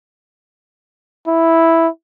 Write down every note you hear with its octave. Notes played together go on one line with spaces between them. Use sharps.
E4